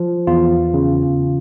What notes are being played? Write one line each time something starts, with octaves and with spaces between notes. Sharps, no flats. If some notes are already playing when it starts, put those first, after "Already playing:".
Already playing: F3
E2 F4
C#3